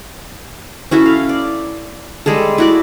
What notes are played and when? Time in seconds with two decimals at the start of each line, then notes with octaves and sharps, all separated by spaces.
0.91 C#4 E4 F#4 A4
1.05 F5
1.29 D5
2.26 G3 G#3 G#4 A4
2.58 E4 F#4 D5